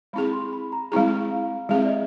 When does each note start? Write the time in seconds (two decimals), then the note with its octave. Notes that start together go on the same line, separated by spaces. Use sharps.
0.13 G#3 C4 E4 G#4 B5
0.33 C6
0.53 B5
0.72 A#5
0.92 G#3 C4 E4 G#4 A#5
1.31 F5
1.69 G#3 C4 E4 G#4 E5
1.85 D5
1.89 D#5